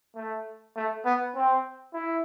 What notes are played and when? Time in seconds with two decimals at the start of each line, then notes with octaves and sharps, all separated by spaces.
0.16 A3
0.76 A3
1.05 B3
1.35 C4
1.94 E4